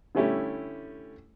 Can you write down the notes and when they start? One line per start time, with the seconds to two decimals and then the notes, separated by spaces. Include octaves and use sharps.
0.15 D3 G3 A3 C#4 E4 G4